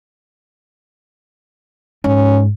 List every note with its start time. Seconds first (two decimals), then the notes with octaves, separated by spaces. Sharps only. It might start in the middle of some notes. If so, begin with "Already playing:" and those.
2.04 G#2 C#4